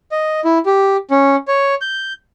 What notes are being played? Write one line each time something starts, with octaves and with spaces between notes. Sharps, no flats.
D#5
E4
G4
C#4
C#5
G6